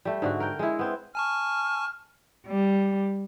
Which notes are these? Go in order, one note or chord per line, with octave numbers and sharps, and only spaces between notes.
G3 A3
G#2 D3 F#4
A#4 G5
G#3 E4
B3 C4
G#5 A5 C#6 F6
G3